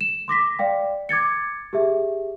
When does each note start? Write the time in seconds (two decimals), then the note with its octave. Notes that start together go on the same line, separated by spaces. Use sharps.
0.01 E7
0.28 C6 D6 A#6 B6
0.59 D5 F5 G5
1.09 D6 G#6 A6 C#7
1.73 G4 G#4 E5